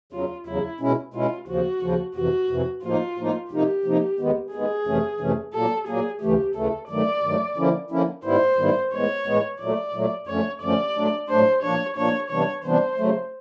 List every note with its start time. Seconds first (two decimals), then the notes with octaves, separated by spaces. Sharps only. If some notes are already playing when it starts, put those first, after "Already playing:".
0.13 E2 C#3 F#3 F4
0.47 E2 C#3 F#3 E4
0.80 B2 G#3 C#4 E4
1.14 B2 G#3 C#4 E4 F4
1.48 D#2 C#3 F3 F#4
1.82 D#2 C#3 F3
2.16 F2 C3 E3 F#4
2.49 F2 C3 E3
2.83 A2 F3 A#3 D#4 F4
3.18 A2 F3 A#3 D#4
3.51 C3 F3 A#3 D#4 G4
3.84 C3 F3 A#3 D#4
4.19 D#2 D#3 G#3 B3
4.52 D#2 D#3 G#3 B3 G#4
4.86 F2 C3 E3 A3 C#4
5.20 F2 C3 E3 A3 C#4
5.54 A#2 F#3 A#3 A4
5.87 A#2 F#3 A#3 G#4
6.21 D2 C#3 E3 A3 G4
6.55 D2 C#3 E3 A3 A4
6.89 G2 D#3 F#3 A3 D5
7.23 G2 D#3 F#3 A3
7.56 D3 F3 A#3 C#4 E4
7.91 D3 F3 A#3 C#4 E4
8.24 G#2 D#3 G3 B3 E4 C5
8.58 G#2 D#3 G3 B3 E4
8.93 A2 E3 G#3 B3 C#5
9.26 A2 E3 G#3 B3
9.60 A#2 F#3 A3 D5
9.94 A#2 F#3 A3
10.27 F#2 D3 F3 A3 C#4 C#5
10.62 F#2 D3 F3 A3 C#4 D5
10.95 A2 F#3 A3 D4
11.29 A2 F#3 A3 D4 C5
11.63 A#2 F3 A#3 D4 C#5
11.97 A#2 F3 A#3 D4 C#5
12.30 C3 E3 G3 B3 D4 C#5
12.64 C3 E3 G3 B3 D4 C5
12.98 C#3 F#3 A3